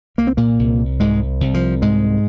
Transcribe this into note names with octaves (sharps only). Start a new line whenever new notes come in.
C2 A#3
C4
A#2 A#3
C2
C2 G#2 G#3
C2
F3
G#2 C3 G#3